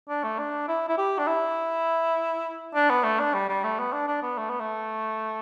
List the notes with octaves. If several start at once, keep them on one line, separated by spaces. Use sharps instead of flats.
D4
A3
D4
E4
E4
G4
D4
E4
D4
B3
A3
D4
G3
G3
A3
B3
D4
D4
B3
A3
B3
A3